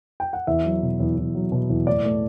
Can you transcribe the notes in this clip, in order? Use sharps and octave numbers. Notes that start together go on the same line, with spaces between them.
G5
F#5
E2 E5
F#3
B2
E2
E2
F#3
B2
E2
A2 D5
A3